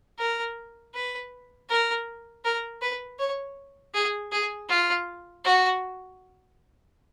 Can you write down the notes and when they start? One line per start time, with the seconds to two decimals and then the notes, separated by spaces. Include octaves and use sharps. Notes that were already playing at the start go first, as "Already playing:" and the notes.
0.18 A#4
0.94 B4
1.69 A#4
2.44 A#4
2.82 B4
3.19 C#5
3.94 G#4
4.32 G#4
4.69 F4
5.44 F#4